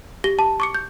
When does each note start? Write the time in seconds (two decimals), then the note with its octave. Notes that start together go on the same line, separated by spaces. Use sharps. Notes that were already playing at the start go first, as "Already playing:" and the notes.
0.24 G4 A#6 G7
0.39 A5
0.60 C#6 D6 C#7
0.75 G6